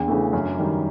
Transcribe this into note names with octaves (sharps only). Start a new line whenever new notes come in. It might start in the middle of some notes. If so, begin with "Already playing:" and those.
Already playing: E2 D4
C#3 E3 A3
F#2
D#3 G3